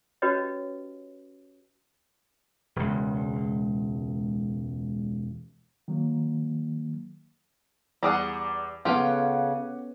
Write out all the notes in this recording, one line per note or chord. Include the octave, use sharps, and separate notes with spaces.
C#4 F#4 G4 B4 C#5 D#5
E1 C#2
D#3 F#3 A#3
E2 G3 G#4 F#5 D6
C#3 B3 C#4 F4 G4 A4 F#5 G5